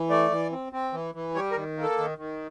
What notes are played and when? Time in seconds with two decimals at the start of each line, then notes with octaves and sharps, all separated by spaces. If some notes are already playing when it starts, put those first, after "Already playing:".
Already playing: E3
0.10 A3 D5
0.31 E3
0.52 C4
0.73 C4
0.93 E3
1.15 E3
1.35 G3 C#5
1.51 A#4
1.56 D#3
1.77 A#3
1.82 A4
1.98 D#3
2.18 D#3